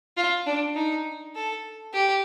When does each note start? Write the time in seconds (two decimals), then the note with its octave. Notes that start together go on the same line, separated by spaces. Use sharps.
0.17 F4
0.46 D4
0.76 D#4
1.35 A4
1.94 G4